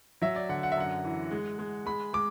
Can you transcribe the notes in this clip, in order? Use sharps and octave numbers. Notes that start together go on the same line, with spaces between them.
F#3 E5
D5
D3 F#5
F#5
E5
F#2 F#5
E3
G#3
G#3
G#3 B5
G#3 D6